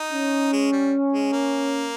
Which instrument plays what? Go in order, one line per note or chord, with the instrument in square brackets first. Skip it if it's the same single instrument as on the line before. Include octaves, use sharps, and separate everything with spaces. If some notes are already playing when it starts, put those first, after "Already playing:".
Already playing: [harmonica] D#4
[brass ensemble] C#4
[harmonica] G#3
G3
G#3
A#3